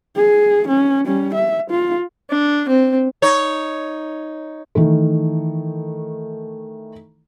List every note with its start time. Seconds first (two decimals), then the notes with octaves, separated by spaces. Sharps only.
0.16 G#4
0.68 C#4
1.06 G3 C#4
1.34 E5
1.70 F4
2.30 D4
2.68 C4
3.22 D#4 C#5
4.75 D#3 E3 A3